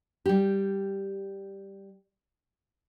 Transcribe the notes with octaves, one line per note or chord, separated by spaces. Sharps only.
G3 G4